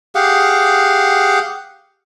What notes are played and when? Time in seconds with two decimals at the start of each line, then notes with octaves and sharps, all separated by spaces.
0.15 G4 G#4 F5 F#5